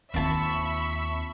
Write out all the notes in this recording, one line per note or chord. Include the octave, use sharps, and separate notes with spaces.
D#2 C4 F4 E5 A5 B5 C#6